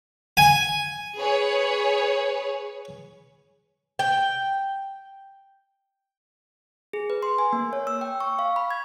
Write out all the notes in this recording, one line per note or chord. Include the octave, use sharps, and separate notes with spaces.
G#5
G#4 B4 C#5
G5
G#4
B4
C6
G#5
A#3
C#5
E6
G5
C#6
F5
B5
G#6